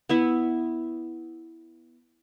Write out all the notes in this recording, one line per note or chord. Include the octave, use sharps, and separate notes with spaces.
B3 E4 E5